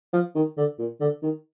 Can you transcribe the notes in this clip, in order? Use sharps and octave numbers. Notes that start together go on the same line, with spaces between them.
F3
D#3
D3
A#2
D3
D#3